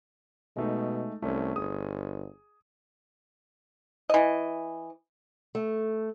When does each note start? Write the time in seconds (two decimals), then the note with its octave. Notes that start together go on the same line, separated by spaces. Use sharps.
0.57 B2 G#3 A3 D#4
1.22 C2 A3 C#4
1.56 G1 G#4 D#6
4.10 E3 D#5
5.55 A3